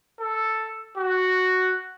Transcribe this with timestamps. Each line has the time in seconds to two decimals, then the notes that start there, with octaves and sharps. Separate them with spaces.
0.20 A4
0.97 F#4